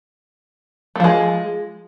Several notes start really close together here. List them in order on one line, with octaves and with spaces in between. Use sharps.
A3 F3 G#3